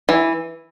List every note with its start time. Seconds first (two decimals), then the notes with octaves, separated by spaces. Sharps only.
0.09 E3